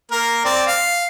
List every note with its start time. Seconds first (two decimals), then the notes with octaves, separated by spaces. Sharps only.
0.11 A#3 A#4
0.45 C4 D5
0.67 F5